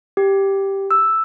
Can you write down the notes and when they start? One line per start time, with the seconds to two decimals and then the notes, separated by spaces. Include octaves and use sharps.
0.17 G4
0.91 E6